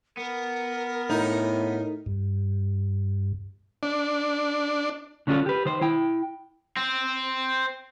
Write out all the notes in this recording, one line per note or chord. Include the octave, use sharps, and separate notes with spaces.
B3 A#4
A2 D#4
G2
D4
D3 C#4 D4 F4 A4
G4 B4
D#3 C5
E4 G5
C4